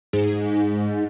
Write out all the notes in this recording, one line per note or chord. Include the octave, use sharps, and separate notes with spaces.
G#2